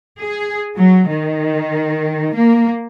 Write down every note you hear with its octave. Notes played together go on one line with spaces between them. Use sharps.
G#4
F#3
D#3
A#3